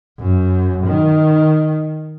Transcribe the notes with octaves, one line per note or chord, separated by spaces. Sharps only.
F#2
D#3